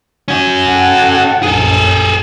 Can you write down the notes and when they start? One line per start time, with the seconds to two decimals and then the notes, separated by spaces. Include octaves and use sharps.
0.28 C#4 F#4
0.67 A4 F#5 G5
1.43 A#1 F#2 G#4 A4